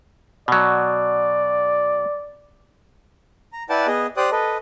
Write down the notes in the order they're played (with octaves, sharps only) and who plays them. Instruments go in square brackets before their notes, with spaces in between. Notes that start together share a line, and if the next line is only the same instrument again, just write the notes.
[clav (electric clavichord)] B2 F#3 [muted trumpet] D5
[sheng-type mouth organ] A#5
E4 B4 D5 F#5 G5 A5
B3 G#4 D#5
G4 C5 D5 G5 D#6 F#6
A4 B4 D#5